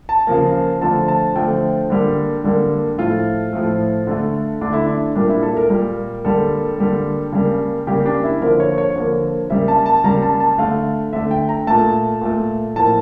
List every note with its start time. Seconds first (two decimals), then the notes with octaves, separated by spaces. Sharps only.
0.09 A5
0.27 C#3 F3 A#3
0.81 D3 F3 A3 A5
1.08 A5
1.36 D3 F3 A3 G5
1.90 D3 G3 A#3
2.44 D3 G3 A#3
2.98 A2 F3 A3 F4
3.53 A2 F3 A3
4.07 D3 A3
4.61 D3 A3 D4
4.73 E4
4.84 D4
5.15 A#2 G3 A#3 D4
5.29 E4
5.43 A4
5.57 A#4
5.70 A#2 G3 A#3 A#4
6.24 D3 G3 A#3 A4
6.78 D3 G3 A#3
7.33 C#3 G3 A#3
7.87 C#3 G3 A#3 G4
8.06 D4
8.24 E4
8.41 D3 F3 A#3 A#4
8.60 C#5
8.78 C#5
8.95 D3 F3 A#3
9.50 C#3 G3 A#3 E5
9.68 A5
9.86 A5
10.04 C#3 G3 A#3 A#5
10.22 A5
10.40 A5
10.58 D3 A3 F5
11.13 D3 A3 E5
11.31 G5
11.49 A#5
11.67 A#2 A3 A5
12.22 A#2 A3
12.76 A2 F3 A#3 A5